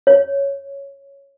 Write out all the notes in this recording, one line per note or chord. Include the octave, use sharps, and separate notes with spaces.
C#5